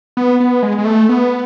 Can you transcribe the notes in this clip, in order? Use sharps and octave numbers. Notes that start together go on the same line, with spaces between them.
B3
B3
G#3
G#3
A3
B3